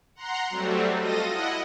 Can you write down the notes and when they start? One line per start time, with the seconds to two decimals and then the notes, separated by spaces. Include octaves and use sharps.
0.15 F#5 A#5 C6
0.50 F#3 G3 A3 C4
0.99 F4 A4 D#5 A#6 D#7
1.29 E4 D#5 F#5